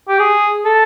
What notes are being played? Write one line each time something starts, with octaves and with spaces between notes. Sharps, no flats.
G4
G#4
A4